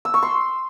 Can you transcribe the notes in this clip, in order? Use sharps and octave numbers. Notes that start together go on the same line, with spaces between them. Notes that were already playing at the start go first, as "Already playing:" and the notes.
E6
C#6
C6